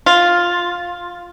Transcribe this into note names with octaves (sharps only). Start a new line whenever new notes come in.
F4